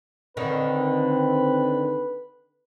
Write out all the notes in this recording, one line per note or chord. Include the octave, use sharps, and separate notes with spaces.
D3 D#3 C4 C#4 B4